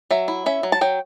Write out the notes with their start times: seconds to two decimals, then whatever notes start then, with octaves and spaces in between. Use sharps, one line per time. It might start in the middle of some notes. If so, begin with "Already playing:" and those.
0.11 F#3 E5
0.28 E4
0.46 C#4 E5
0.63 F#3
0.72 A5
0.81 F#3 G5